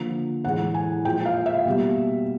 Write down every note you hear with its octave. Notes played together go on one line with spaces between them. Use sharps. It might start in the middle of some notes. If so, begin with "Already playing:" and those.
Already playing: D3 F3 A#3
A2 E3 G#3 F#5
G#5
A#2 F3 G#3 G5
F5
E5
B2 G3 A#3